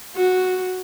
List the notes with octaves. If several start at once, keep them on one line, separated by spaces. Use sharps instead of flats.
F#4